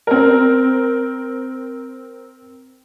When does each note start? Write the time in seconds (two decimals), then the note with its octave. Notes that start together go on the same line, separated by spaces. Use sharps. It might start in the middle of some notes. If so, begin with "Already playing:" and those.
0.07 C4 A#4